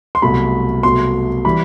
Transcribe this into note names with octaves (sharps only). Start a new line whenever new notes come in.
C6
C2 B2 F#3 A3 B5
C2 B2 F#3 A3 C6
E3 G3 B5